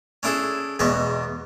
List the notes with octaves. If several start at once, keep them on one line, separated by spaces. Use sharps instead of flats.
C#4 D4 E4 G#4 A4
E2 G#2 B2 B3 C#6